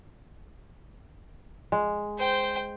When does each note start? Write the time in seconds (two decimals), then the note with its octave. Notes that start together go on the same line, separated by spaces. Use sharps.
1.72 G#3
2.19 C5 G5